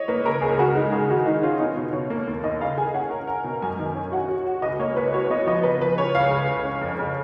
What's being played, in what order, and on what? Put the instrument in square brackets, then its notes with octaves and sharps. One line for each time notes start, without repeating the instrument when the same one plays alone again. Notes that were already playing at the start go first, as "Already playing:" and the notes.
Already playing: [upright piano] C#5 D#5
[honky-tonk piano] A#3 [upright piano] B4
[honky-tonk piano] C#3 [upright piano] A#4
[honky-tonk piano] C#2 [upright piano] G#4
[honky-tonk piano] C#3 [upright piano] F#4
[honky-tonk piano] G#3 [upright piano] D#4
[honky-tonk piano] C#3 [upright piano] G#4
[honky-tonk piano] D#3 [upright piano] F#4
[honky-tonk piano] D#3 [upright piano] D#4
[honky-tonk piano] C#4 [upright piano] F4
[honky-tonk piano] B3 [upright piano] D#4
[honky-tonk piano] B2
[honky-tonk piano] B2 [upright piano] C#5
[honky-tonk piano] A#3
D#2
[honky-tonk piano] D#2 [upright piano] D#5
[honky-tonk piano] C#3 [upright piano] F5
[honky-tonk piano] G#4 [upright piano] G#5
[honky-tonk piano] C#4 [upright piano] F#5
[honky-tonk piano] A#4
A#4
B2
[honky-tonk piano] F#2 [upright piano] G#5
[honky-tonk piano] D#3
C#4
[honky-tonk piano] F#4 [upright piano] F#5
[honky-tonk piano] F#4
F#4
[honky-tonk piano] C#2 [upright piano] D#5
[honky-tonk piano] A#3 [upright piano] C#5
[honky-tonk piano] C#2 [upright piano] B4
[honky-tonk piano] F#4 [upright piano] C#5
[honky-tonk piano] B3 [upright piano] D#5
[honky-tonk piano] F3 [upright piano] D#5
[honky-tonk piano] C#3 [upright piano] B4
[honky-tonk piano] F3 [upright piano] B4
[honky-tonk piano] C#3 [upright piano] C#5
[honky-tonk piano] C#2 [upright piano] F5
[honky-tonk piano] C#3
C#2
C#4
F2
C#3